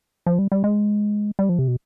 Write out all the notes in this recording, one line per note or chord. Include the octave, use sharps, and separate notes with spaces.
F3
G3
G3
G#3
G3
F3
C3
B2